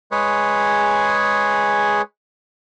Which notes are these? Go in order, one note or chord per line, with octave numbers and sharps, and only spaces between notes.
G#3 G#4 B4 C#5